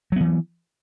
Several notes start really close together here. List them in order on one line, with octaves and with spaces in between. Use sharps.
F#3 B3 E3